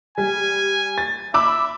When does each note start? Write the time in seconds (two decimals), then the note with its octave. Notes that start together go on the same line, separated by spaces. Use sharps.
0.18 G3 G#5
0.98 A6
1.34 E5 B5 D6 E6